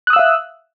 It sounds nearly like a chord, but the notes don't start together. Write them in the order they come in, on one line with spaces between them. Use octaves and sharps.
F#6 D#6 E6 F5 E5